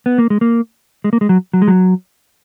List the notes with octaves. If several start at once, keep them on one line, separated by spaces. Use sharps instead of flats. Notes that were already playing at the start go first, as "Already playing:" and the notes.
B3
A#3
G#3
A#3
G#3
A#3
G#3
F#3
F#3
G#3
F#3